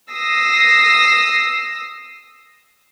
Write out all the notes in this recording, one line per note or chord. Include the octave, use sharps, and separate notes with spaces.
D#6 E6 A#6 C7